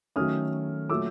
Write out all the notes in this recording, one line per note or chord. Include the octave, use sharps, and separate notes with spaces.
D#3 F#3 A3 C#4 D#6 F6
A#2 F#3 A3 D6 E6